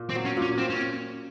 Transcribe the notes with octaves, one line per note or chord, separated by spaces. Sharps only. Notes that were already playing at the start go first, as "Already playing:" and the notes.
Already playing: A#2
C4
F#3
C#4
A#2
C#4
A#2 C4
C#4